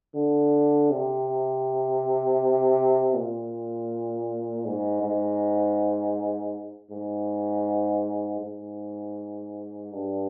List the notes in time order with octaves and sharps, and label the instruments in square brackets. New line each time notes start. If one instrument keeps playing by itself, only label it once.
[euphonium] D3
C3
A#2
G#2
G#2
G#2
G#2
G2